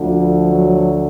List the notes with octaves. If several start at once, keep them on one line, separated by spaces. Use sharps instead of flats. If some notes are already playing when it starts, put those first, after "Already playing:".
Already playing: D2 D3 F3
F#3